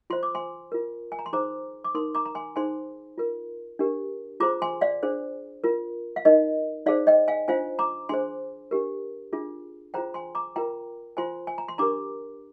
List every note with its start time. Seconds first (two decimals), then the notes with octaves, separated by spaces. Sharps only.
0.10 F4 C5 C6
0.23 D6
0.35 G#5 C6
0.72 F4 A#4
1.12 G#5
1.19 A#5
1.26 C6
1.33 D#4 G#4 C5 A#5 D6
1.85 D6
1.95 D#4 A#4 C6 D#6
2.15 A#5 D6
2.26 A#5
2.35 G#5 C6
2.56 D#4 G#4 C5 G#5 C6
3.18 F4 A#4
3.79 D4 G4 A#4
4.40 F4 G#4 C5 A#5 D6
4.62 G#5 C6
4.81 D5 F5
5.03 D4 G#4 C5
5.64 F4 A#4
6.16 F5
6.25 D#4 A#4 D#5
6.86 D#4 G#4 C5 D5 F5
7.07 D#5 G5
7.28 F5 G#5
7.48 D4 F4 C5 F5 G#5
7.79 A#5 D6
8.09 D4 G#4 C5 G#5 C6
8.71 D4 G4 A#4
9.33 D4 F4 G#4
9.94 F4 G#4 C5 G5 A#5
10.14 G#5 C6
10.35 A#5 D6
10.56 F4 A#4 G5 A#5
11.17 F4 C5 G#5 C6
11.47 G#5
11.58 A#5
11.68 C6
11.78 D4 G4 A#4 A#5 D6